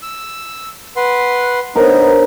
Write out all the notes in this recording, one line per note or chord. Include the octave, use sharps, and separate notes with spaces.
E6
B4 F#5 C6
B3 D4 D#4 A#4 C5 C#5